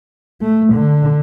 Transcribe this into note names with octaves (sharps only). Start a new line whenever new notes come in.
A3
D3